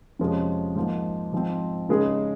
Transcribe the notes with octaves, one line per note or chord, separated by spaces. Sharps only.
F2 C3 F3 G#3 C#4
G#2 F3 A#3
G#2 F3 C4
C#3 G#3 D#4 G#4